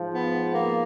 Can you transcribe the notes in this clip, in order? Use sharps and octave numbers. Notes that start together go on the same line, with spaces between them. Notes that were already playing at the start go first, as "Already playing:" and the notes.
Already playing: G#2 F3
B3
A#3